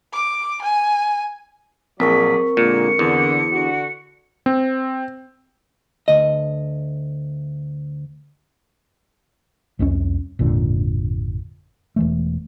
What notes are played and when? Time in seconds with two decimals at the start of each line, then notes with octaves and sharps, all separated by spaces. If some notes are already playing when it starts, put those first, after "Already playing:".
0.13 D6
0.61 G#5
2.00 A#1 F#3 C4 G#4 A#4 D5 C#6 B6
2.57 A#2 D3 G#3 A#3 C#7
2.99 E2 D3
3.53 D3 F#4
4.46 C4
6.08 D2 D#5
9.79 C2 F2 G3 C#4
10.39 G#1 F2 A#2 D3
11.96 E1 E3 A3